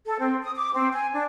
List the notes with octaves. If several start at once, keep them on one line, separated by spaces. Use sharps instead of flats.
A4
C4
D#6
D6
C4
G#5
D4